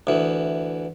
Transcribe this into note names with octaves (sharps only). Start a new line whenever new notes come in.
D2 E3